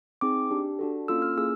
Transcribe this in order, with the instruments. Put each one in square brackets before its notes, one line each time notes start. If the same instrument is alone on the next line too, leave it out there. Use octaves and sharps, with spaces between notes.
[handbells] C4 D#4 G#4 D6
D4 G4
D4 F#4 A4
A#3 C#4 F4 A4 E6
F6
A#3 C#4 E4 G#4 E6